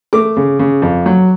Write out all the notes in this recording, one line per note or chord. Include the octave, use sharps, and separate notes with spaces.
A3 D6
C#3
C#3
F2
F#3